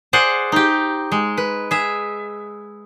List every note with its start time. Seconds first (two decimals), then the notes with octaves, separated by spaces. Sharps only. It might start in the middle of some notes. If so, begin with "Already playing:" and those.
0.13 G#4 C5 D5 F#5 G#5
0.52 D#4 G4
1.12 G#3
1.38 B4
1.71 G#4 E5